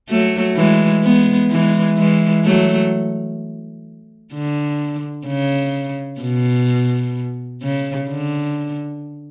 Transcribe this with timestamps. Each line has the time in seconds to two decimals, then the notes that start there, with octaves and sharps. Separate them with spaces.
0.10 F#3 A3
0.57 E3 G#3
1.03 G#3 B3
1.51 E3 G#3
1.97 E3 G#3
2.44 F#3 A3
4.33 D3
5.27 C#3
6.21 B2
7.62 C#3
8.09 D3